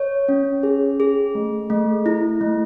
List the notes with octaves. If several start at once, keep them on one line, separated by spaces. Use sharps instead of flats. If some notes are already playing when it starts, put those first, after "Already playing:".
Already playing: C#5
C#4
G#4
G#4
A3
A3
E4
A3